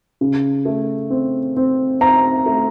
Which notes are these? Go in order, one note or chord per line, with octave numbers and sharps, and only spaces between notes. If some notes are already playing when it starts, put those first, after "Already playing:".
C#3
A3
C4
C4
C4 A#5
A3